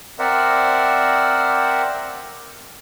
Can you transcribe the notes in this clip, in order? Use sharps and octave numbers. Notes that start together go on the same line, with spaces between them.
C4 A#4 C5 D5 E5 F#5